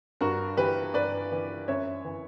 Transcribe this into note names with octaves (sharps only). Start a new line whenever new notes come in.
G2 F#4 A#4
E3 G4 B4
G2 B4 D5
E3
F#2 C#5 E5
E3